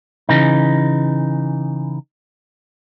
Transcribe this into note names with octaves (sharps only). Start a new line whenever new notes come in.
C#3 E3 D#4